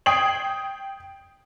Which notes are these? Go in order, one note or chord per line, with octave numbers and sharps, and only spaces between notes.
G5 D#6 G#6 C7 F#7